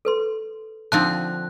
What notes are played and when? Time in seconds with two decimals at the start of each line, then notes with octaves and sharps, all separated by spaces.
0.05 A4 B4 C6
0.92 D3 F3 C4 D#4 F5 A5 F#6